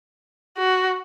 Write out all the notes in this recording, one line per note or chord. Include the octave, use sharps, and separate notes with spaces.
F#4